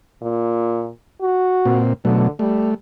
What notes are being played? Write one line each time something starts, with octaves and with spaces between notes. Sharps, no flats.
A#2
F#4
A#2 C4
B2 D3 F#3 A3
G3 A3